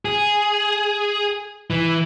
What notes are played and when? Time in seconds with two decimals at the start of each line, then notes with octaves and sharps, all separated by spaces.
0.05 G#4
1.70 E3